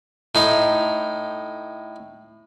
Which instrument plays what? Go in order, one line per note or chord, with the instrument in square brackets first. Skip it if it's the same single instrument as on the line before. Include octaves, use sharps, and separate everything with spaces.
[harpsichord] A2 D#4